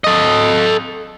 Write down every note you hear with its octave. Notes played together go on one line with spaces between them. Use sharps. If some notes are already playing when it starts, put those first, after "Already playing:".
A4 D#5